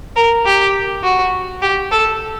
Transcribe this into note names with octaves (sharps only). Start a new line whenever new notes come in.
A#4
G4
F#4
G4
A4